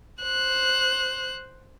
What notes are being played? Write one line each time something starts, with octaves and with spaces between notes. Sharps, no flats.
C5 F#6